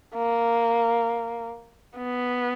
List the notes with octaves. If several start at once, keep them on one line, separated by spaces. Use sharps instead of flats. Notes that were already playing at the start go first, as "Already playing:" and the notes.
A#3
B3